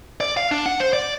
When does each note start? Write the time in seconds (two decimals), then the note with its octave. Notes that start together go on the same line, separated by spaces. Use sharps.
0.21 D5
0.37 F5
0.51 D4
0.66 F#5
0.80 C5
0.93 D5